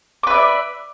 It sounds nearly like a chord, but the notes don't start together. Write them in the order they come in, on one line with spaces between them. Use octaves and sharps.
D6 B4 E5 D5